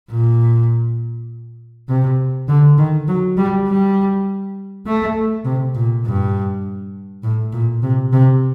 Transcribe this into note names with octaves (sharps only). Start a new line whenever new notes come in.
A#2
C3
D3
D#3
F#3
G3
G3
A3
C3
A#2
G2
A2
A#2
C3
C3